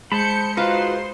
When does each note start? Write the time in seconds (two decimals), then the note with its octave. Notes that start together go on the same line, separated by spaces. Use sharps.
0.12 G#3 C5 A5 B5 G6 C#7
0.57 D#4 F4 F#4 B4 C5 C6